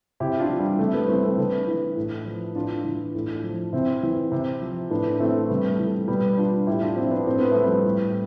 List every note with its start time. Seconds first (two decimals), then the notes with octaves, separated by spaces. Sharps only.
0.20 C3 E4 G4
0.39 D4 F4
0.49 E3
0.59 G3
0.79 C3 A3
0.93 G3 B3
1.08 E3 A3 C4
1.23 A3 C4
1.38 C3 B3 D4
1.67 E3
1.97 A2
2.26 F3
2.55 A2 D4 F4
2.84 E3
3.15 A2
3.44 F3
3.73 C3 C4 E4
4.03 E3
4.32 C3
4.62 F3
4.90 A2 B3 D4
5.20 E3 A3 C4
5.49 C3 G3 B3
5.69 A3
5.79 E3
6.08 B2 G3 B3
6.37 D4 F4
6.67 A2 E4 G4
6.82 D4 F4
6.96 F3 C4 E4
7.11 B3 D4
7.26 A2 C4
7.39 B3
7.51 F3 A3
7.63 G3 B3
7.85 A2